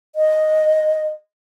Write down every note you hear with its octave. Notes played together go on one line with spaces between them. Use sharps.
D#5